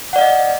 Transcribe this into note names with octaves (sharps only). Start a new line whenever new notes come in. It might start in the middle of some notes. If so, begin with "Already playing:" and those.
D5 D#5 F5 F#5